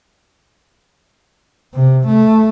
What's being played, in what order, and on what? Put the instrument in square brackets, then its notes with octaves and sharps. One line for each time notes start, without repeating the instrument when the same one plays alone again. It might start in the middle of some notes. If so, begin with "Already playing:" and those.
[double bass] C3
A3